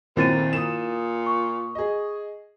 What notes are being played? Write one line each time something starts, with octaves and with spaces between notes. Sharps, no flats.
F#2 A#2 D#3 C4 E4 A6 D#7
A2
A#2 D#6 E7
C#6
G#4 D#5